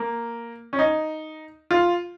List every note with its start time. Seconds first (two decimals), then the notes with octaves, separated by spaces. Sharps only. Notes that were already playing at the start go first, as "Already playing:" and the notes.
Already playing: A#3
0.73 C#4
0.79 D#4
1.71 F4